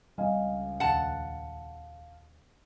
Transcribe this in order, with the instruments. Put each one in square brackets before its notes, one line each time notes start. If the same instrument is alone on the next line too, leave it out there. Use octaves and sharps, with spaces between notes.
[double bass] C#2 [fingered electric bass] G3 C4 [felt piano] D#5 F5 G#5
[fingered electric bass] D#1 [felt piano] F5 [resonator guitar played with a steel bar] F#5 A5